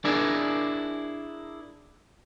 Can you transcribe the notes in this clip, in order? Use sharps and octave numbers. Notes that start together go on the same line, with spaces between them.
D4 E4 G#4 A#4